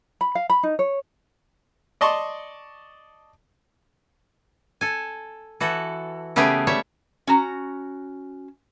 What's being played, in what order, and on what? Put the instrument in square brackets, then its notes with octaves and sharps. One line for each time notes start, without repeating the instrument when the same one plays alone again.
[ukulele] B5
F5
B5
D#4
C#5
[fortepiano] D5 D#5 A5 C6 C#6
[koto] A4 G#5
E3 F#4 A4
C#3 A3 B3 G4 G#4
G3 C#5 E5
[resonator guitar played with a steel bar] C#4 F#4 A#5